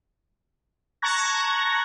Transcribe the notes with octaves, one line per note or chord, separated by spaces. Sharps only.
A5 A#5 C#6 F#6 G#6 A#6